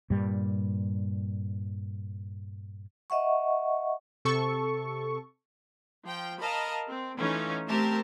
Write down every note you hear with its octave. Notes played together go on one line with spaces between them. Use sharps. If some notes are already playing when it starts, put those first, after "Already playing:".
G2 A#2 G3
D#5 E5 F#5 C#6
C3 A4 C#6
F3 G5
A#4 D#5 F5 A5 B5
C4
E3 A3 C#4 D#4 F4
A3 C4 G4 A#4 C5 A5